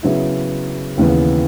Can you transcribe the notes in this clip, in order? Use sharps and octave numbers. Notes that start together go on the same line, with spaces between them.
C#3 F#3 B3 E4
D#2 C#3 E3 B3